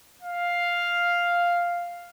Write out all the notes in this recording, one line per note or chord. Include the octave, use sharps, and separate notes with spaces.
F5